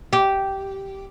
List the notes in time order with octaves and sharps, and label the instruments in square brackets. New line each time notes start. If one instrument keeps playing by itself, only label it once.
[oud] G4